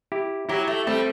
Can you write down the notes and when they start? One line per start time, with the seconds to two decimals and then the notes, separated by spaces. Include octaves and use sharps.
0.12 E4 G4
0.49 F#3 E4 G4
0.68 A3
0.87 G3 A3 C4